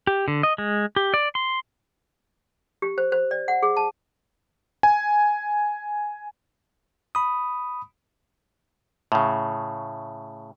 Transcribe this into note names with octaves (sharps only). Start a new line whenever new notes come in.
G4
D3
D#5
G#3
G4
D5
C6
G4
C5
C5
D5
F#5
G#4
A5
G#5
B5 D#6
A2 C#3